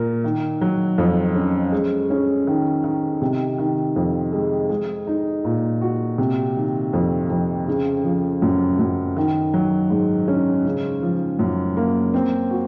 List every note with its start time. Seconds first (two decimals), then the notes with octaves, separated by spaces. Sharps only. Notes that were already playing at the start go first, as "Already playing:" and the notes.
Already playing: A#2 A#4
0.24 D#3
0.61 F#3
0.98 F2
1.35 C#4
1.72 G#3
2.10 C#4
2.47 D#3
2.84 D#3
3.22 C3
3.58 D#3
3.96 F2
4.33 G#3
4.69 G#3
5.07 D#4
5.45 A#2
5.81 F#4
6.18 C3
6.56 D#3
6.93 F2
7.30 F2
7.68 C#3
8.04 F3
8.42 F#2
8.79 F#2
9.17 D#3
9.54 F#3
9.90 G#2
10.28 C#4
10.65 C#3
11.02 F3
11.39 F#2
11.77 A#3
12.14 C4
12.51 F#4